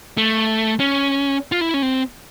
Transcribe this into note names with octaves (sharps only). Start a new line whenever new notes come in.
A3
C#4
F4
E4
C#4
C4